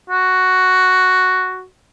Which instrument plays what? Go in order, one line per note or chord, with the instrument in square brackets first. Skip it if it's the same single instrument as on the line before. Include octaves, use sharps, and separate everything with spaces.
[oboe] F#4